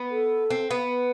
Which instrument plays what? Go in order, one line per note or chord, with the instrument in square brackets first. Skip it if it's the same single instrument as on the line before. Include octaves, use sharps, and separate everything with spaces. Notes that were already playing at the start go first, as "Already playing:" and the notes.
Already playing: [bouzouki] B3
[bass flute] A4
[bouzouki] C4
B3
[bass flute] B4